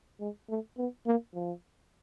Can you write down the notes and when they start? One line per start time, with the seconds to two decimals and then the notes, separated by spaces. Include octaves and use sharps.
0.20 G#3
0.49 A3
0.78 B3
1.06 A#3
1.35 F3